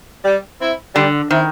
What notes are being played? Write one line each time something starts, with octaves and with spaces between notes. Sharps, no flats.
G3
C4 E4
D3 G3
D#3 C4 E4